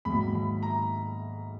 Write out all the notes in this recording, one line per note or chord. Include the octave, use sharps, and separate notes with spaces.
G#2 D#3 F#3 A#3 B5
B5
A#5